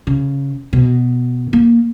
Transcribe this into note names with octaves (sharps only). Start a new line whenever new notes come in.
C#3
B2
A#3